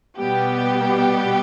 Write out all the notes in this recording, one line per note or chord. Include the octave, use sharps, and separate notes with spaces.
B2 G3 B3 G4